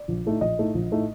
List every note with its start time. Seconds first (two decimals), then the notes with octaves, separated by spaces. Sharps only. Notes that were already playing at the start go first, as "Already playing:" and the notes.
Already playing: D5
0.08 A#1
0.25 A2 A3 D#4
0.41 A#1 D#5
0.58 A2 A3 D#4
0.74 A#1
0.92 A2 A3 D#4